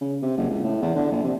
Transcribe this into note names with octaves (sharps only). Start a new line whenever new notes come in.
C#3
C3
F#1
C#2
A2
E2
D3
A#1
C3